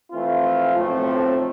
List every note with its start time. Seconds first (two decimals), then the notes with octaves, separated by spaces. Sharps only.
0.12 E3 A3 C4 F4
0.73 B1 A2 F3 A3 C4